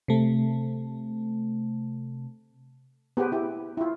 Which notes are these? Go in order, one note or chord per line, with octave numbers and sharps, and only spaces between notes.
C3 A3
B3 G4 G#4 B4 C5
E4 G4
E4 F4